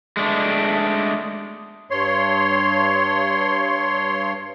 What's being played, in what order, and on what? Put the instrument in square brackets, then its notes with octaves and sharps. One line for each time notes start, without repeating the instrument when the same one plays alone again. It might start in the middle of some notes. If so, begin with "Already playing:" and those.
[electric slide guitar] G#3 A3 D4
[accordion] G2 C#5 C6